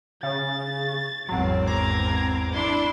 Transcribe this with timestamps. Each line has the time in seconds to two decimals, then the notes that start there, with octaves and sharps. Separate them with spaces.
0.23 C#3 A6
1.29 G#1 E2 F#3 C4
1.67 A#5 D6 G#6
2.54 D4 E4 C6